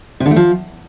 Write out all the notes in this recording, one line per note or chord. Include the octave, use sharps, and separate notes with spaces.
C3
D3
A3
F3